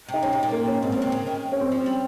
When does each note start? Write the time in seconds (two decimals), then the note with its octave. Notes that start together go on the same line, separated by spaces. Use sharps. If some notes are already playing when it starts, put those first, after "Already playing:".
0.08 C3
0.14 D#4
0.23 C3 C#4
0.33 C3
0.43 A#2
0.52 A#3
0.68 C#4
0.82 G#2 C4
0.92 A#2
0.98 C3 C#4
1.12 C#3
1.27 D#3
1.52 C#4
1.61 C4
1.72 F3
1.86 G3